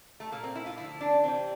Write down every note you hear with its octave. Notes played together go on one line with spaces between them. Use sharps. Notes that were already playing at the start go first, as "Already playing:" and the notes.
A3
A#2 A3 A#3
C4
E4
F4
D3 F3 A3 E4
D4
C3 E3 G3 C4